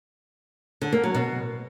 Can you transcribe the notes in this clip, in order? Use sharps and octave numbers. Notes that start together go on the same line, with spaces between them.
D3
A#3
F#3
B2